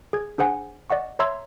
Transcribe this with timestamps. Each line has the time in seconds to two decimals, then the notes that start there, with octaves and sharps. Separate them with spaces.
0.13 G#4 G#6
0.38 D4 G#4 C5 F#5 G#5
0.90 D5 D#5 F#5 C#6
1.19 C#5 E5 A#5 C6 E6 G#6